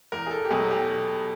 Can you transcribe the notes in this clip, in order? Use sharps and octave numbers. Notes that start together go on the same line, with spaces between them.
E2 A#4
G#4
A4
G4
B2 F#3 A3 G#4
G4